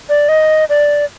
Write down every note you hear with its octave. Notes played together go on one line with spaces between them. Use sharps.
D5
D#5
D5